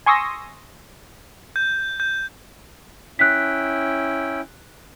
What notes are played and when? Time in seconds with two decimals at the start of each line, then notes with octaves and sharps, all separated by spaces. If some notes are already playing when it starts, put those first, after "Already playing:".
0.06 G#5 C6 C#6 D#6 E6 A#6
1.56 G6
2.00 G6
3.19 C#4 E4 G5 F#6 B6